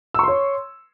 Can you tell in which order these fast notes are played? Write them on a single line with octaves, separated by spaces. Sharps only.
E6 C#6 C6 C#5